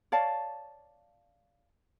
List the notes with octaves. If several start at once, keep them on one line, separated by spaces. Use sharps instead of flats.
C#5 D5 F5 A5